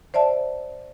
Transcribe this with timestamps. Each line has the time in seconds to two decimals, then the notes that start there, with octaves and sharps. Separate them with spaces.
0.14 C5 D5 E5 A5